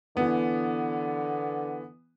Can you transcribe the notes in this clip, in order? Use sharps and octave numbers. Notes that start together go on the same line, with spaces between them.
D3 E3 B3